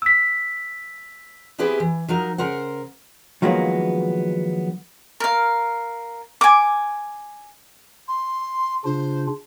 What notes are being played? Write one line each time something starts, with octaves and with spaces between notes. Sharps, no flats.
E6 B6
B3 C4 E4 G4 G#4 B4
E3
F3 F#3 D#4 A#4
C#3 A#4 C5 F#5
D#3 F3 F#3 G#3 A#3 B3
A#4 F5
G#5 D6
C6
C#3 D4 F4 C5